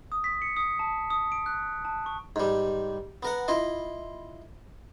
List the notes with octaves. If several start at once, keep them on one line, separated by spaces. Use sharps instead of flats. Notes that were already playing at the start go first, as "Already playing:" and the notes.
D#6
B6
C#7
D#6
A5
D#6
D7
F#6
A5
C#6
G#2 G3
B3 A#4 F#5
E4 F4 D#5